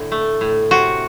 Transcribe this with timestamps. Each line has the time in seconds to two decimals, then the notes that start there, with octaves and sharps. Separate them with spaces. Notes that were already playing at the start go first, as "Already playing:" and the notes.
Already playing: A2 D3
0.12 A3
0.41 A2
0.71 C3 F#4